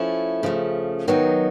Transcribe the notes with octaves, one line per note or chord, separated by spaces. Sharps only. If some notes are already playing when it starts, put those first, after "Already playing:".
Already playing: F3 A3 C#4 E4
C#3 F3 A3
D#3 F#3 B3 D#4